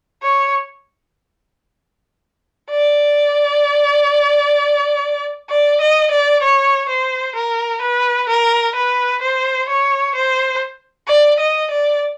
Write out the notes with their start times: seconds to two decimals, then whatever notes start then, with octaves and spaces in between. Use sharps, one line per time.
0.23 C#5
2.71 D5
5.49 D5
5.81 D#5
6.11 D5
6.42 C#5
6.89 C5
7.35 A#4
7.82 B4
8.29 A#4
8.75 B4
9.22 C5
9.69 C#5
10.15 C5
11.08 D5
11.40 D#5
11.71 D5